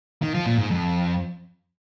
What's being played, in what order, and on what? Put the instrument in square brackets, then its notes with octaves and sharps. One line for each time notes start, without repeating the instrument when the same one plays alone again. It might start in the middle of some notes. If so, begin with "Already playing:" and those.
[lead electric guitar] D#3
F3
A#2
G#2
F2